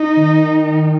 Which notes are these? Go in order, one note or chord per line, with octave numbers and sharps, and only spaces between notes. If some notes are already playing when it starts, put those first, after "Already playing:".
Already playing: D#4
D#3